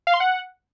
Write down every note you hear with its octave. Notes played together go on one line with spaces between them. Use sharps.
F5
C6
F#5